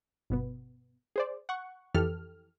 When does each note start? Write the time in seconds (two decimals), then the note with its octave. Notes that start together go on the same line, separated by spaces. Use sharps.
0.30 G1 B2 B3
1.16 G#4 C5 D5
1.49 F#5 C#6
1.94 F2 E3 G4 A4 F6